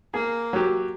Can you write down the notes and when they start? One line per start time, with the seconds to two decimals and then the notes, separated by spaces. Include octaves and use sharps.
0.14 A#3 G#4
0.53 F#3 G4